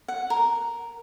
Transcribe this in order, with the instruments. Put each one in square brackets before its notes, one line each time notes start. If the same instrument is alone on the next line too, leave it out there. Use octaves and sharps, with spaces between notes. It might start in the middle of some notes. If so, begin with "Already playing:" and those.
[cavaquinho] F#5
A#4